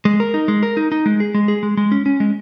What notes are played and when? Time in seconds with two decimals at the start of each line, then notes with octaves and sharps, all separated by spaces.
0.05 G#3
0.20 A#4
0.34 D#4
0.48 G#3
0.63 A#4
0.77 D#4
0.92 D#4
1.06 G#3
1.20 G#4
1.34 G#3
1.48 G#4
1.63 G#3
1.77 G#3
1.92 C#4
2.06 C#4
2.20 G#3